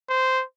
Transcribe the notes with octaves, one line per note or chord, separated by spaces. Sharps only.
C5